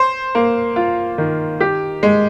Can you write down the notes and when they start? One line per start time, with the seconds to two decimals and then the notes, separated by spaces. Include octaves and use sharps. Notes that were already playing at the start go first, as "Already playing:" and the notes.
Already playing: C5
0.35 A#3
0.76 F4
1.18 D#3
1.61 G4
2.03 G#3